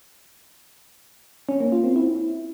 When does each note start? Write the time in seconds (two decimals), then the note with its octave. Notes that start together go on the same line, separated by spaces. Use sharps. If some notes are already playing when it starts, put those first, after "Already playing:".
1.49 C#4
1.60 A#3
1.72 F4
1.84 C4
1.96 E4